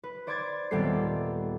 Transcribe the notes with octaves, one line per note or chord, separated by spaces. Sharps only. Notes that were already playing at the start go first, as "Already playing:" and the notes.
B4
C5 D5 C6 D6 G#6 A6
D#1 G3 B3 C4 A4 C7